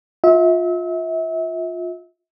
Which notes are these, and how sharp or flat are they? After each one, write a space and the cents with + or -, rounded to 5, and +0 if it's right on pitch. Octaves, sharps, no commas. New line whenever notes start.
F4 +20 E5 -35